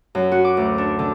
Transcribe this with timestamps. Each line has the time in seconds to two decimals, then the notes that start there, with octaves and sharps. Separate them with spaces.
0.15 F#2
0.32 F#4
0.45 D6
0.57 D2
0.78 D4
0.99 D3